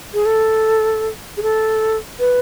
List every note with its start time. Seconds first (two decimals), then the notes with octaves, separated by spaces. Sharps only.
0.14 G#4
0.26 A4
1.37 G#4
1.43 A4
2.19 B4